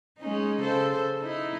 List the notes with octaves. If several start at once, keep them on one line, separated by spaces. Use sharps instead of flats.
G#3 C#4 D#4
C#3 A4 C5
D#4 E4